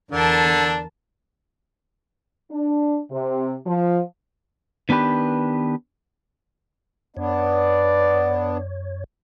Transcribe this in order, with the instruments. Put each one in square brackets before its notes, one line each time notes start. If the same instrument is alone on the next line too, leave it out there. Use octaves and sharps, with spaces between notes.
[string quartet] E2 A#4 A5 [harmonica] D3 D4
[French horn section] D4
C3
F3
[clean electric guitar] D#3 B3 D4 G4 B4
[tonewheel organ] F#2 C#5 [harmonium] B3 D4 [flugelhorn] D5